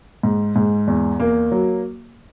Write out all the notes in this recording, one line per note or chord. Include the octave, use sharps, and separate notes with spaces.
G#2
G#2
E2
A#3
F#3